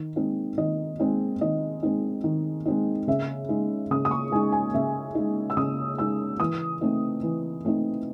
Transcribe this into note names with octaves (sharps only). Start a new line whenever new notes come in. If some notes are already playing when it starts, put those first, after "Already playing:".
Already playing: D#3
G#3 C4 D#4
D#3 D#5
G#3 C4 D#4
D#3 D#5
G#3 C4 D#4
D#3
G#3 C4 D#4
C#3 E5
G#3 D#4
C#3 D#6
D#6
C#6
G#3 D#4 G#5
G#5
C#3 E5
G#3 D#4
E6
C#3 D#6
G#3 D#4 E6
E3 D#6
A3 C4 D#4
E3
A3 C4 D#4